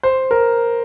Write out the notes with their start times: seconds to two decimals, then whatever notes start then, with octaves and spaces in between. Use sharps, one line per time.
0.03 C5
0.31 A#4